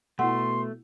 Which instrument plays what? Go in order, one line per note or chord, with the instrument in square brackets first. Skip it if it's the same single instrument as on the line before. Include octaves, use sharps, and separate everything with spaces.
[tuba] B2 [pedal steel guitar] A3 [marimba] E4 F#5 [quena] C6